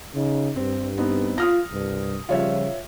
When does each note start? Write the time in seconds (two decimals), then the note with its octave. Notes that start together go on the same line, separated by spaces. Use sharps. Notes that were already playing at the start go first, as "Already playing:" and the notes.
0.14 C#3 D#4
0.56 G2 C4
0.98 B3 C4 D#4
1.38 F4 D#6 F6 A#6
1.71 C2 G2
2.29 C#3 F3 G3 F4 C#5 E5